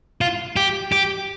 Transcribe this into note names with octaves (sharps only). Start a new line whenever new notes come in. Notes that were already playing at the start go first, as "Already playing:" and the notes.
F4
G4
G4